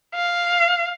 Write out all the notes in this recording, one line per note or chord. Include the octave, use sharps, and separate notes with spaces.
F5